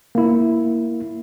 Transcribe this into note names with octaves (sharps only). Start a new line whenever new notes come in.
A#3 E4